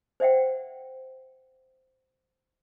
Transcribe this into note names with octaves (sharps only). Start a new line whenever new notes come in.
C5 D5 E5 F#5 G5